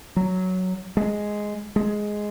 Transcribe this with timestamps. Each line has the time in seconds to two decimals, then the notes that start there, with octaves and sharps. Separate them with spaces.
0.16 F#3
0.97 G#3
1.76 G#3